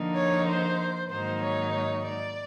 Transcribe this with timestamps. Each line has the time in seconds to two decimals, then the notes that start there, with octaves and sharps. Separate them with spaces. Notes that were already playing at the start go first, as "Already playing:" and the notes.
Already playing: D3 F3 A#3 D#4
0.15 C#5
0.46 C5
1.09 G#2 D#3 F#3 A#3 D#4 C5
1.41 C#5
1.72 C#5
2.03 D5